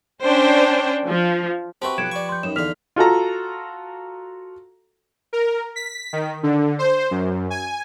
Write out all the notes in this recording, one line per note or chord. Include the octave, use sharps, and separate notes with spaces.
C#4 D4 C5 G5
F3
C4 F#4 G4 B4 E5 A5 C6 C#6
B1 F3 F#6 G#6 C#7 D7 E7
D5 C#6
C6 G6
F#2 D#4 E7
E2 D3 F5 F6 B6 F7
F4 F#4 A4 A#5
A#4
B6
D#3
D3
C5
F#2
G#5